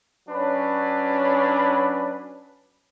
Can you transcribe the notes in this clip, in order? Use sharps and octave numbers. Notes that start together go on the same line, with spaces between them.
F#3 C#4 D4 B4